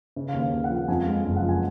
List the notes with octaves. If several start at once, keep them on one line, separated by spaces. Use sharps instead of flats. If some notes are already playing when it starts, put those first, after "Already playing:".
C#3
F5
D#2
F5
D#2 F5
F#5
F3
F#5
F2 G#5
F5
G#3
F#1 F5
F#5
F3
G#5